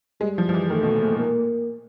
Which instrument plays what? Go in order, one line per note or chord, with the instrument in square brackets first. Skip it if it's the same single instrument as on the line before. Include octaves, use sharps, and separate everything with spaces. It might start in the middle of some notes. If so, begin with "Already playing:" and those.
[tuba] G3 [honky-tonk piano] G#3
[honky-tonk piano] F3
F3
E3
[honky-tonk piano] D#3 [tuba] A3
[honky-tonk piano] B2
A#2
A#2
[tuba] A#3